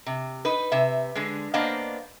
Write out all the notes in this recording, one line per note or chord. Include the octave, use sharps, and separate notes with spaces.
C3
D#4 B4
C3 E5
D3 G#3
A#3 B3 D4 C5 D#5 F5